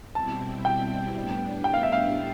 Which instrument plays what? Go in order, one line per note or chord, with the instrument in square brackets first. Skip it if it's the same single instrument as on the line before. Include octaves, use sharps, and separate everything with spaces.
[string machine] B2 G3 C4 E4 [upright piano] A5
[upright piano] G5
[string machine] A2 G3 B3 D4
[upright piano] G5
F5
E5
F5